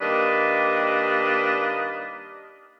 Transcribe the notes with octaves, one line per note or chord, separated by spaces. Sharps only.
D#3 G3 A#3 D4 B4 D#5